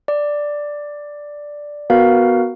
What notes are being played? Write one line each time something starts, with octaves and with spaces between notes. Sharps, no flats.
D5
B3 F#4 A#4 B4 F5